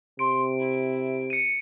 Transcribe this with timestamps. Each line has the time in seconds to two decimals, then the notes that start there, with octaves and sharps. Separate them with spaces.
0.19 C3 C6 D7
0.58 E4
1.30 C#7 D#7